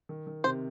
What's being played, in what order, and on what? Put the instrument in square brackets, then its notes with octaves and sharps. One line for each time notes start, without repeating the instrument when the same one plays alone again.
[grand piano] D#3
D#3
[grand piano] C3 [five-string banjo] C5